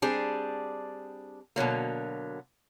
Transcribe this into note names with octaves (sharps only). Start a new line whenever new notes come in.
G3 C4 D4 G#4
B2 D3 F#3 A#3